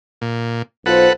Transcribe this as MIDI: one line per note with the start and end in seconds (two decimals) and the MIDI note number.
0.22 0.62 46
0.86 1.09 35
0.86 1.09 65
0.86 1.13 69
0.86 1.13 71
0.86 1.09 72
0.86 1.13 78